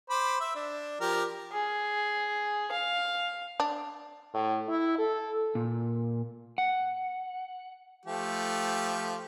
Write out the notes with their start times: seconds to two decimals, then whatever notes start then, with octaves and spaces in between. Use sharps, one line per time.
0.10 C5 B5 D6
0.41 E5
0.55 D4
1.01 F3 G4 A#4
1.52 G#4
2.72 F5
3.60 D4
4.34 A2
4.69 E4
4.98 A4
5.55 A#2
6.58 F#5
8.06 F3 A3 G4